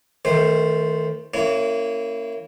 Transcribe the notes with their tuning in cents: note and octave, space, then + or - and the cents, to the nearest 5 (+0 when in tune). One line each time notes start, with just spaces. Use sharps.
D#3 +30 A3 +5 C5 +0
A#3 -25 C#4 +0 E4 +0